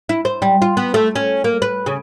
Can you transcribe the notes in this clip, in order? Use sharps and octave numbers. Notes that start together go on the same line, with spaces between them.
E4
C5
G3
F4
B3
A3
C#4
A#3
B4
C#3